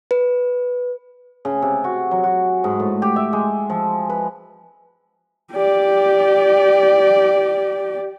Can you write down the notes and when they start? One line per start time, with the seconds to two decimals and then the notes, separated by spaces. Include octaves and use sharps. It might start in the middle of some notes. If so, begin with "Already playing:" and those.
0.11 B4
1.45 C#3
1.62 C3
1.84 F#4
2.11 F#3
2.24 F#4
2.64 G#2
2.80 A2
3.02 G4
3.16 E5
3.33 G#3
3.70 F3
4.10 B4
5.53 G4 D5